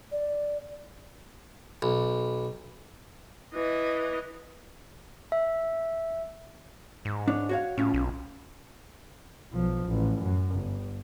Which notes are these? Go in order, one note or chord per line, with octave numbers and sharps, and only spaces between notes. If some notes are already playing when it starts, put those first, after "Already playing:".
D5
B1
E3 D#5
E5
G#2
D4 C#5
F#4 C#5 F5
A2 C#4 F4
B1
B1 F3
A1
F#2
G1